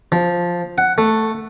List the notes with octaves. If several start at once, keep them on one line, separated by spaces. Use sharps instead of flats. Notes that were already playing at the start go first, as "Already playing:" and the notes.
F3
F#5
A3